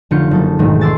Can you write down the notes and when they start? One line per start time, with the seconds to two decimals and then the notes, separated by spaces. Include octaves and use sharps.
0.11 F1 D3 F4 G6 C#7
0.31 F#1 A4
0.59 B1 E2 G#2 D#3 G#3 A3
0.81 C6 D6 E6 A6